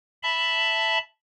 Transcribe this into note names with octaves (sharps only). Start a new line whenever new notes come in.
E5 A5 B5